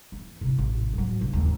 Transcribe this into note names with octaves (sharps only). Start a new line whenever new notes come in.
E3
C3 E4
A1
F3 F#3
A2 C#3
G#1 D#2